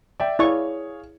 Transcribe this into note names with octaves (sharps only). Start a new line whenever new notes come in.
D5 E5 G5
E4 G#4 C#5 D5 F5 C#6